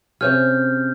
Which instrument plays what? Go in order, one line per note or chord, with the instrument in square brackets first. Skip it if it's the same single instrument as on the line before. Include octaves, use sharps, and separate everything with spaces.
[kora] C3 C#4 G#4 [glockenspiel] F6 G6